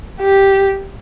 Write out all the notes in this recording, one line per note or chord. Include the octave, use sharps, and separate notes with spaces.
G4